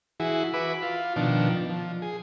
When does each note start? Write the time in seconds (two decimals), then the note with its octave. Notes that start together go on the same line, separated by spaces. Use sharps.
0.20 E3 E4 F#4 G#4
0.54 F#4 B4 E5 B5 D6
0.82 F4
1.16 B2 D#3 F3 D4
1.70 F3
2.02 G#4